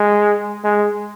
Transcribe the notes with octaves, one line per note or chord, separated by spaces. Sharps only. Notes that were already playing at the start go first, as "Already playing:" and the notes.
Already playing: G#3
G#3